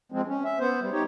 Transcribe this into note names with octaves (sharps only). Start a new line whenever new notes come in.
F3 G#3 C4
C#4
E5
B3 C5
G3
D#4 G4 C#5